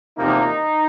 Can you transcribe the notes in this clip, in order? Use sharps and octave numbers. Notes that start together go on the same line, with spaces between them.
E2 C3 F3 A#3 D#4